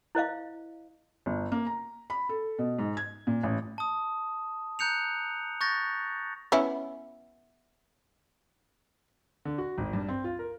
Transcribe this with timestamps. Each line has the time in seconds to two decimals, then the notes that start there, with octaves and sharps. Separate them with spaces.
0.15 E4 C5 D#5 F5
1.26 G1
1.52 A#3
1.66 A#5
2.10 B5
2.29 A4
2.59 B2
2.79 G#2
2.97 G#6
3.27 A#2
3.43 A1
3.78 A5 D#6
4.79 A#5 F#6 G6 C#7 F7
5.61 C#6 F#6 G6 A6 A#6
6.52 B3 C#4 E4
9.45 D3
9.58 F#4
9.78 G#1
9.93 G2
10.09 C4
10.24 F4
10.39 A#4